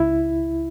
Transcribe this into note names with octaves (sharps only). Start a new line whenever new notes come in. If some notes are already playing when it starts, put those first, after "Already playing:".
Already playing: C#2 E4